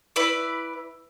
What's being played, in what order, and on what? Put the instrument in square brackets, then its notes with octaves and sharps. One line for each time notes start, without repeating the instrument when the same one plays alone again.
[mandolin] E4 B4 D5